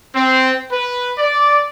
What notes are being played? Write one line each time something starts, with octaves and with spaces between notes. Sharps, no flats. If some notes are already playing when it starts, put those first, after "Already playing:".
C4
B4
D5